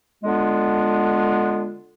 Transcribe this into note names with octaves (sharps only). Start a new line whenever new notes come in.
D3 G#3 B3 D4 F4